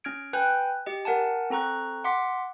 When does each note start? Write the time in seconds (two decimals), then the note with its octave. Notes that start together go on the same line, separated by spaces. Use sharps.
0.04 C#4 F6 G#6 D7
0.33 B4 G5 G#5 F#6 G6
0.86 G4 D#5
1.05 A#4 F#5 G#5 A5
1.50 C4 A4 A#5 C#6 F#6
2.04 F#5 C6 D6 B6